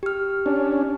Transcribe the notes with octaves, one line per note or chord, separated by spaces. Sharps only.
G4 F6
C#4 D4